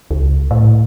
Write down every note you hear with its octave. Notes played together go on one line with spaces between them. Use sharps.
C#2
A2